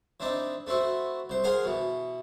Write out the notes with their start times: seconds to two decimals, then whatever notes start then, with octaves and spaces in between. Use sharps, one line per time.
0.20 E3 C4 D4 D#4
0.67 A3 C4 E4 F#4
1.30 C2 C5
1.44 G#4 A#4 C5 F5 F#5 G#5
1.65 B2 E3